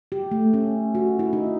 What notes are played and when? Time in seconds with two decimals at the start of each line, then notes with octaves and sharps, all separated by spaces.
0.12 G4
0.31 A3
0.54 C#4
0.95 F#4
1.19 E4
1.33 D#4